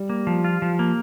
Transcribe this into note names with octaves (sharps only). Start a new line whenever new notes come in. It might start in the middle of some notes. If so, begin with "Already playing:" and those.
Already playing: G3
A#3
F3
F4
F3
A#3